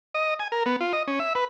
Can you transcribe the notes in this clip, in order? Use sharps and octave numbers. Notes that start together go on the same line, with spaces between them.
D#5
G#5
A#4
B3
F4
D#5
C#4
E5
B4